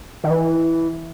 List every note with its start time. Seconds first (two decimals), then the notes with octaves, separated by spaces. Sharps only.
0.24 D#3
0.30 E3